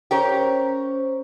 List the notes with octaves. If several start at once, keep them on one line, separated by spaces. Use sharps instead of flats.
C#4 G4 A#4 C5 C#5